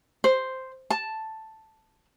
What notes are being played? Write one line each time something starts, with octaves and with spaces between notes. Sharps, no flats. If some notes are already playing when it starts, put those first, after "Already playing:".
C5
A5